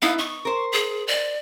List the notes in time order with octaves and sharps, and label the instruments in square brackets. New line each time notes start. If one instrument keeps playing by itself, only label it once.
[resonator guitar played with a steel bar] B3 D#4 E4 [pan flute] F5
[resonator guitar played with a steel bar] D#4 [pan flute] C#6
[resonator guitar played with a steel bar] A#4 C5
[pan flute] G#4
D5